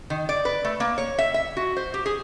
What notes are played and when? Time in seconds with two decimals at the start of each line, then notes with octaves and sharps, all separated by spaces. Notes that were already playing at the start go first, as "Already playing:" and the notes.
0.10 D#3
0.29 D5
0.45 B4
0.64 A3
0.80 A#3
0.98 C#5
1.19 E5
1.34 E5
1.57 F#4
1.77 C5
1.94 G4
2.06 G#4